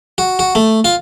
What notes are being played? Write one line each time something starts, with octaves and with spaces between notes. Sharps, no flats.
F#4
F#4
A3
F4